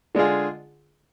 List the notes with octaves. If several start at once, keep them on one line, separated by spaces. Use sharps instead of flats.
D3 G#3 D4 F4 G#4